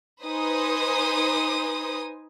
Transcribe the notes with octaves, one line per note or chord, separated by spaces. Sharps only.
D#4 B4 C5 G#5 D#6